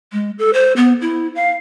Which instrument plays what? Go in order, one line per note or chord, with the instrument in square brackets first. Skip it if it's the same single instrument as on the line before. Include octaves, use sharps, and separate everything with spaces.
[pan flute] G#3
A4
C5
B3
E4
F5